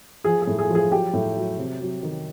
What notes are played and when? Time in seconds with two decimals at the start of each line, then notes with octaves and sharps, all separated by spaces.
0.24 F3 G#4
0.42 G#4
0.47 A2
0.59 G#4
0.70 F3 G#4
0.91 F#3 G4
1.14 A2
1.37 F#3
1.58 C3
1.81 F#3
2.03 D#3